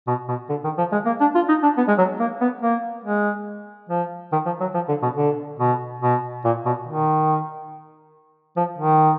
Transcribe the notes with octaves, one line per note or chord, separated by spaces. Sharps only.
B2
B2
D3
D#3
F3
G#3
A#3
D4
F4
D#4
D4
B3
G#3
F#3
A#3
B3
A#3
G#3
F3
D#3
F3
F#3
F3
D3
B2
D3
B2
B2
A#2
B2
D#3
F3
D#3